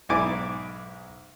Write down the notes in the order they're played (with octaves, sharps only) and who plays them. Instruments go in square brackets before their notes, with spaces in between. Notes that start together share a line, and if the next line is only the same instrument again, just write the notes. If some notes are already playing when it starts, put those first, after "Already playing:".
[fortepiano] B1 G#2 E4 G#5 D6